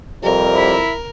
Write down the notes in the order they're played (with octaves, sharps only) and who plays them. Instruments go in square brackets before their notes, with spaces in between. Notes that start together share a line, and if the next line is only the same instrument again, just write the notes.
[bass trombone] F2 [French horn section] C3 G3 C4 [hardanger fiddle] A#4
[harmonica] E4 B5